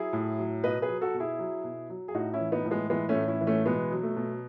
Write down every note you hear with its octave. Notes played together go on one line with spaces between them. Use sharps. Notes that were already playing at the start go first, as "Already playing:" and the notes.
Already playing: F#3 E4 G#4
A2
F#3
B2 B4 D#5
G#4 B4
F#3
F#4 A4
B2
E4 G#4
F#3
B2
F#3
G#4
A2 D#4 F#4
C#4 E4
E3
B3 D#4
A2
G#3 B3
E3 G#3 B3
A3 C#4
A2
C#4 E4
E3
A3 C#4
B2 G#3 B3
F#3
A3
B2